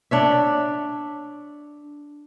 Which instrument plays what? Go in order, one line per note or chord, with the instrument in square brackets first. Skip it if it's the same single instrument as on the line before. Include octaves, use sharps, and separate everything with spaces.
[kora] D4 C#5 E5